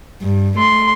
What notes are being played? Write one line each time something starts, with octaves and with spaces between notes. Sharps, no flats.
G2
A3 C6